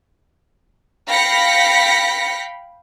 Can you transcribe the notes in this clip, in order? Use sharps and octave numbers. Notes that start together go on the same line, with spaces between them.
F5 G5 B5 A#6 B6 C#7